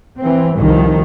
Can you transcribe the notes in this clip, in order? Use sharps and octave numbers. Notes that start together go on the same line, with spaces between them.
E3 C4
C2 D#3 F3